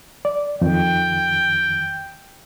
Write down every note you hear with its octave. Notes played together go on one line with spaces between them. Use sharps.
D5
F2 D#3 G5